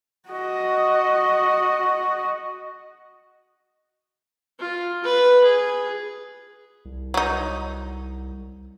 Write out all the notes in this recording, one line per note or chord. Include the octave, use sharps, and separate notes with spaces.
F#4 D#5
F4
B4
G#4
C2
F#3 D#4